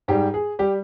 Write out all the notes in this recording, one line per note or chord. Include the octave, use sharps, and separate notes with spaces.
G#2 G3 G4
G#4
G3 G4